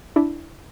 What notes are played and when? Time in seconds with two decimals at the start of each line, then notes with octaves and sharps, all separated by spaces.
0.16 D4 E4